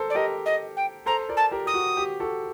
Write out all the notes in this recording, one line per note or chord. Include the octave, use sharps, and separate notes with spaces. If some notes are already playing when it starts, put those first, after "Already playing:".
Already playing: A4 A#4 C5 A5
D5
G4 A#4 D#5
D#5
G5
A4 C5 A#5
A#4 D5
A5
G4 A#4
G4 D#6
F#4
G4
F#4 A4